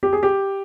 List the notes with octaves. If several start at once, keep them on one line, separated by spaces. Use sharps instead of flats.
G4
G#4
G4